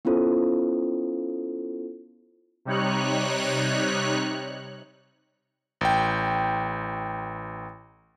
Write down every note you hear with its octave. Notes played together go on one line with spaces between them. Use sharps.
B3 C#4 E4 F4 A4 C5
C3 G3 D#4 C#5 F#6
A1 G5